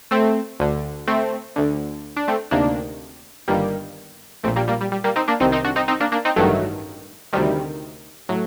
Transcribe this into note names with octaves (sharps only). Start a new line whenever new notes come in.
A3 C4
D2 D3
A3 C4
D2 D3
D4
A3 C4
D2 C3 D#3 A#3 D4
G1 G2 D#3 G3 A#3
A#1 A#2 A3 C4
G3 A#3
G3 A#3
G3
G3
G3 A#3
C4 D#4
A#3 D4
C2 C3 D#3 C4 D#4
C4 D#4
D4 F#4
C4 D#4
C4 D#4
A#3 D4
A#3 D4
C4 D#4
A1 G2 D#3 F#3 A3
D2 C3 D#3 G3
A2 F#3